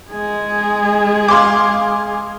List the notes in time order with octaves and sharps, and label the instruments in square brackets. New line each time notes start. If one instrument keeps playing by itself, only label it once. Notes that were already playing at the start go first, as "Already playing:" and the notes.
[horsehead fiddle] G#3 G#4
[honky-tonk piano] F5 C6 D6